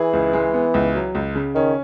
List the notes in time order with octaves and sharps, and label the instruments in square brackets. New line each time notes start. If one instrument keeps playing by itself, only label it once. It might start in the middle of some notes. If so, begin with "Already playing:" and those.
Already playing: [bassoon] E3 [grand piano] G#4
[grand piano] C#2
G#3
B3
C#2
F#3
C#2
C#3
[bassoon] D#3 [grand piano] C#4